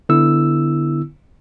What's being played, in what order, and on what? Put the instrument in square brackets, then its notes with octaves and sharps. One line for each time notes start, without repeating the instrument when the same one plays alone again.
[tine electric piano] D3 B3 E4 E6